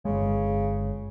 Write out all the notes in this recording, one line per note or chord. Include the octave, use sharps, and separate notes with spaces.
G1 C#3 G#3